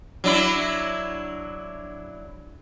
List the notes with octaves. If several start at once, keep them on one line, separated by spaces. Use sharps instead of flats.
F#3 D4 E4